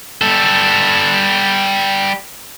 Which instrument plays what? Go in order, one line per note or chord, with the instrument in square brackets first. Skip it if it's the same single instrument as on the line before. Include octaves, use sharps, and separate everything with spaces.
[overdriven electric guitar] G3 A4